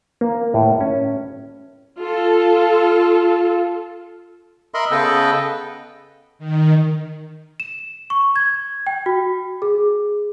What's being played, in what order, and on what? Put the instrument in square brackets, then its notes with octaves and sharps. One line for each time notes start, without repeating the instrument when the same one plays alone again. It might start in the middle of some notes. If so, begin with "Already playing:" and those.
[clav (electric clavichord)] A#3
A2
C#4
[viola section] F4 A4
[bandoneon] A#4 D#5 E5 B5 C6
C#3 B3 A4 B4 D#5 G5
[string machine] D#3
[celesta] E7
C#6
G#6
G5
F#4
G#4